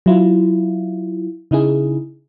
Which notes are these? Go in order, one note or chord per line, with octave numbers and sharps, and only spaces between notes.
F#3 E4 F4
C#3 D#4 E4 G#4